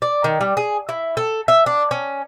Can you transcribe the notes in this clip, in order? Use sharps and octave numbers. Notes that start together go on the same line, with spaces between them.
D5
D#3
G3
G#4
E4
A4
E5
D4
C#4